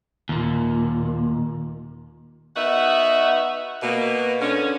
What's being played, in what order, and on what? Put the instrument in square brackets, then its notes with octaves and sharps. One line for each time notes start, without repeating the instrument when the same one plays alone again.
[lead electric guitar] D#2 A#2
[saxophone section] B3 D#4 F#4 E5 F#5
B2 A#3
D3 C#4